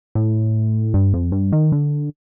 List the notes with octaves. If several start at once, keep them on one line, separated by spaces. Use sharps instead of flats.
A2
G2
F2
G2
D#3
D3